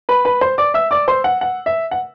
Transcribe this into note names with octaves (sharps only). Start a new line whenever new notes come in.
B4 B5
B4 B5
C5 C6
D5 D6
E5 E6
D5 D6
C5 C6
F#5
F#5
E5
F#5